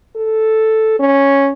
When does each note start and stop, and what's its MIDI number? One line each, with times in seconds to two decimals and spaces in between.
0.16 0.98 69
1.00 1.52 61